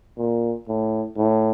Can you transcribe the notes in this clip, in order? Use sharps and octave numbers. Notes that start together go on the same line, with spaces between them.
A#2
A2
A2